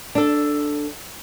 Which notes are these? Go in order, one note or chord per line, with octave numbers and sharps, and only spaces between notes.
D4 A4